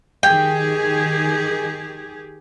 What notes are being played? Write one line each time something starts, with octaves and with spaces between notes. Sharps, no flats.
D#3 G4 G#4 G5